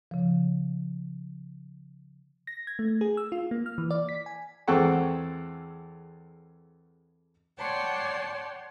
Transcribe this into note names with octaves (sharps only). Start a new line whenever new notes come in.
C#3 F3
A#6
G#6
A3
G#4
E6
F4
A#3
F6
E3
D5
B6
G#5
E2 G#3 C4 A4 F#5 C#6
C#5 D5 F#5 G5 A5 C6